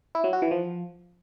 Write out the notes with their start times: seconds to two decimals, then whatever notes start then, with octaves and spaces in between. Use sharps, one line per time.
0.15 E4
0.24 F#3
0.33 F#4
0.42 E3
0.51 F3